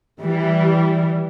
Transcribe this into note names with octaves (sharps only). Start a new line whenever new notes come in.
E3 G3